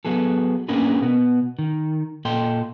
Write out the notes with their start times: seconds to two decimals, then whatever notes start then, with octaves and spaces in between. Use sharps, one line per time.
0.05 F#3 B3 G#4 A4
0.68 A#3 C#4 D4 G#4 A#4 B4
1.02 B2 B3
1.59 D#3
2.25 A#2 A4 D#5 G5 C6